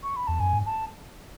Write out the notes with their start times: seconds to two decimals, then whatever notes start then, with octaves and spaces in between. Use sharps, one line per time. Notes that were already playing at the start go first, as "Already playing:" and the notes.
0.03 C#6
0.16 B5
0.27 E2 A5
0.40 F#2 G#5
0.53 G#2
0.66 A5